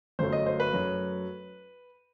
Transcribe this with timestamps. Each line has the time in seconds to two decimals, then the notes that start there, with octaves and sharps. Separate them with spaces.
0.19 G1 F#2 F#3 A3 C5
0.32 D#5
0.46 C5
0.60 B4
0.73 F#2 F#3 A3